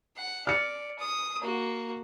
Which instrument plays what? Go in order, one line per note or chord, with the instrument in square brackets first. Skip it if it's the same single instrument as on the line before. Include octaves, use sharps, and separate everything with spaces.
[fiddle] F#5
[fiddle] D5 [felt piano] F6 C#7
[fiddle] D#6
A#3 F#4